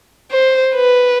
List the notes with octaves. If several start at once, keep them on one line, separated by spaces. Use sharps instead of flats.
C5
B4